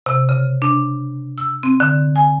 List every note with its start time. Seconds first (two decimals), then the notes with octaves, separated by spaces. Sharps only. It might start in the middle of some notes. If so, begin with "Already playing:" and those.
0.06 C3
0.29 C#3
0.62 D4
1.38 E6
1.63 C4
1.80 D3
2.16 G#5